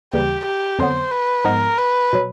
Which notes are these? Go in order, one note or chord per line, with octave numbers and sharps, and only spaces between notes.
D#2 C#3 E3 G3 G4
G4
F2 D3 F#3 B3 C5
B4
G#2 F3 G#3 B3 D#4 A#4
B4
B2 F#3